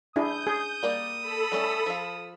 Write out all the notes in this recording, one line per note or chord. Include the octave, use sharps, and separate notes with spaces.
D4 E4 G#4 D#6 G6
G#4
G3 A#3 D5
A4 B5 E6
G3 A3 C#4
F3 F5